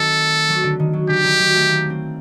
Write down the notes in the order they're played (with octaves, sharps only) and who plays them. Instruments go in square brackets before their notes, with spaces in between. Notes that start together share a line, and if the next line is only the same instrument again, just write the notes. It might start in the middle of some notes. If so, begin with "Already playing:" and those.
Already playing: [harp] D#3 F#3 A3 C4 [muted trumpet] A4
[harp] F#3
D3
D#3
F#3
[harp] D3 [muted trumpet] G4
[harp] D#3
F#3
A3
A#3
C4